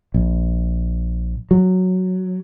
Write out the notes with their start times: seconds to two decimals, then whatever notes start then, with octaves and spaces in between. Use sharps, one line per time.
0.14 A#1
1.51 F#3